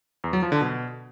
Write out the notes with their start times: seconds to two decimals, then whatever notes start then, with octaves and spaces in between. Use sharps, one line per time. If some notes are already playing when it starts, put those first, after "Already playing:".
0.24 E2
0.33 F#3
0.42 F3
0.52 D3
0.61 B2